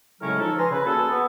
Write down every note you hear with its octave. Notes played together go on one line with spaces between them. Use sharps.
A2 C#3 F#3 G#3 C#4 A#4
F3 D#4 A4
B4 G#5 A#5 C6
C#3 B4
A#3 C#4 F#4 G#4 A4
B3